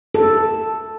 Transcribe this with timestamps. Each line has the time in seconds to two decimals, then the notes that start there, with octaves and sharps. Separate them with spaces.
0.15 A4